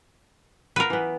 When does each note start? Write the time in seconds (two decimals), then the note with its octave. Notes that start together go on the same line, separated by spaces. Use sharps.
0.76 B3 F4 A#4 B4
0.90 E3 B3